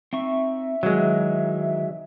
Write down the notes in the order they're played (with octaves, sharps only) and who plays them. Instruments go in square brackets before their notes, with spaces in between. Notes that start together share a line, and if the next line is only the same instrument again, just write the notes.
[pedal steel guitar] C4 D#4 C#6 [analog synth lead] E5
[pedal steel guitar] D#3 E3 [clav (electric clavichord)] F#3 G#3